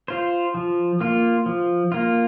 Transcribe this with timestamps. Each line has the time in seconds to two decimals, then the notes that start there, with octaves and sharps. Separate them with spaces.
0.08 F4 C5
0.54 F3
1.01 A#3 F4
1.46 F3
1.92 A#3 F4